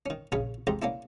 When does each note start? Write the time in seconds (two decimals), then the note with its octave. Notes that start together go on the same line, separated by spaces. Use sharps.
0.06 D#3 C#4
0.32 A#1 C#3 C#4 C#5 B5
0.67 F2 G#2 G4 A#5
0.82 A#3 C#4 D4 E4